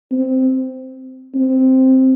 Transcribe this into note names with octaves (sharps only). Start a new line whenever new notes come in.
C4
C4